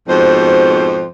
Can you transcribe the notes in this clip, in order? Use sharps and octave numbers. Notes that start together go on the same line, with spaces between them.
F2 G#2 B2 C5